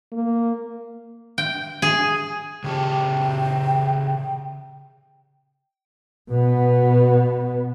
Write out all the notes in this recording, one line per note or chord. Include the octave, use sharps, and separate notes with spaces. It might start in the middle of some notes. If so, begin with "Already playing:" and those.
A#3
G5
G#4
C#3 G4 G5 A5
B2 B3